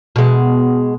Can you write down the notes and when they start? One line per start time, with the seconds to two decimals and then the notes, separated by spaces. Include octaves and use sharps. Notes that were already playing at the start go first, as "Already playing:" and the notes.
0.16 B2 G#3